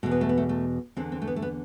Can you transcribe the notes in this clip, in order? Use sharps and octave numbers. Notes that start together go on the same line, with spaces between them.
E2 B2 A3
B3
A3
B3
A3
A3
E2 D3 C4
C4
A3
B3
A3
B3